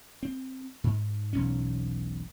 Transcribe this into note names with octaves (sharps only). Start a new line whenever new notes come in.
C4
G#2
E1 B1 C#4